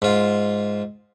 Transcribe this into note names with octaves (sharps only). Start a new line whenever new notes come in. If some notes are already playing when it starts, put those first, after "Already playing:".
G#2 F4